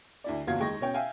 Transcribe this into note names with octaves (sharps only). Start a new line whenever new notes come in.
D2 E4 D5
F#1 E2 F4 F#4 F5 G#6
D#2 G#3 G5 C#6 A#6
B2 C#4 C#5 G5
E5 F5 G5 G#5